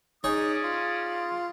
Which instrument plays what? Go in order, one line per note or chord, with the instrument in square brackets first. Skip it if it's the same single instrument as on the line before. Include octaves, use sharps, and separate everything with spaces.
[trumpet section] C#4 D5 D#6 [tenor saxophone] D#4 [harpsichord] G#4 C#5
[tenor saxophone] F4